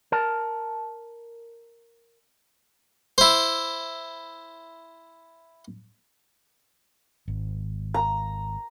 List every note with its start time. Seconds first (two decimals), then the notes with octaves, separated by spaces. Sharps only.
0.12 A#4 A5
3.18 E4 C5
7.28 G#1
7.94 A#5